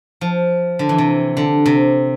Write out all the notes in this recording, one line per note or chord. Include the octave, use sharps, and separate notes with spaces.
F3
D3
E3
C3
D3
C3